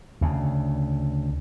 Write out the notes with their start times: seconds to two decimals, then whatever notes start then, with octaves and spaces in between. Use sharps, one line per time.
0.21 D2 C#3